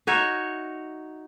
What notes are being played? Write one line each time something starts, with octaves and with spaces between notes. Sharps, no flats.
D#4 F#4 C#5 E5